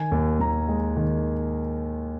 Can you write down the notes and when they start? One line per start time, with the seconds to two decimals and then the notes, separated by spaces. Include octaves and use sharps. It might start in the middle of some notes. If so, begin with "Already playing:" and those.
Already playing: D#3 G#5
0.12 D#2
0.40 D#2 A#5
0.69 G#3
0.97 D#3